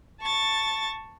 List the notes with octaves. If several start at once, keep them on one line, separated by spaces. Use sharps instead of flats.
A5 C#6 A6